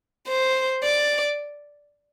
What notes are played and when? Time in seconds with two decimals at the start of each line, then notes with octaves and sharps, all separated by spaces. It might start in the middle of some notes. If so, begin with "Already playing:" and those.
0.28 C5
0.83 D5